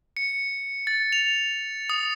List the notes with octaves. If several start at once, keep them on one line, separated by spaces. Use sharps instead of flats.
C#7
A6
F7
D#6